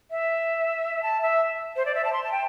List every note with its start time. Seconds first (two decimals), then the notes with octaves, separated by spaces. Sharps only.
0.11 E5
1.03 A5
1.22 E5
1.76 C5
1.86 D5
1.95 E5
2.05 A5
2.13 C6
2.23 A5
2.32 G5